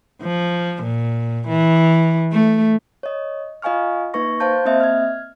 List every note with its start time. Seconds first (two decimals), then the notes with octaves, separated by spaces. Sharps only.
0.22 F3
0.83 A#2
1.48 E3
2.32 A3
3.03 C#5 D#5
3.62 F4 D#5 F5 G#5 C#6 F6
4.14 A#3 D#4 B4 C#6 A#6
4.40 C5 F5 A5 G6
4.65 A#3 C4 D#5 E5
4.80 F6 G#6